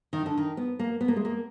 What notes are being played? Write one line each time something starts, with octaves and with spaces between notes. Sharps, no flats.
D#3
D3
D#3
B3
A#3
B3
A#3
G#3
A#3